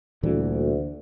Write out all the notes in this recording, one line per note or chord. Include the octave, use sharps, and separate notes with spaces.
D2 A#2 E3 G3